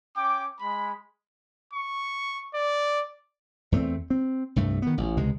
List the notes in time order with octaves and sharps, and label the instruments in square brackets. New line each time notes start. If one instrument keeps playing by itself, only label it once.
[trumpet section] C#4 G5 D6
G#3 B5
[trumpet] C#6
D5
[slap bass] E2 A3 A#3 C4
C4
C2 G2 A3
D#3 B3
A1
C#2 C3 G#3